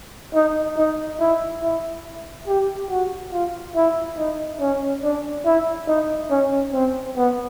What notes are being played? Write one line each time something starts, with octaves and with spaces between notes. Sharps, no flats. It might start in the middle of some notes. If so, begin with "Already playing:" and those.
D#4
D#4
E4
E4
G4
F#4
F4
E4
D#4
C#4
D4
E4
D#4
C#4
C4
B3